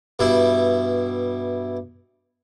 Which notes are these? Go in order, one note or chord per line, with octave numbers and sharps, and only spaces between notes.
G2 B2 E4